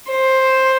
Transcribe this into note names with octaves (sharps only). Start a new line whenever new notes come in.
C5